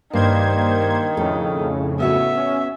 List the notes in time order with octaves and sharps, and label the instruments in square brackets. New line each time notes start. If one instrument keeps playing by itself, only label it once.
[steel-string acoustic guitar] G2 [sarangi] D#3 [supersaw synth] A#3 C5 G#6
[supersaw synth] F2 A2 C#3 [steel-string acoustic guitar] A4
[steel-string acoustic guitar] B3 F#4 C#5 [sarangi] E5
[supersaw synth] C#4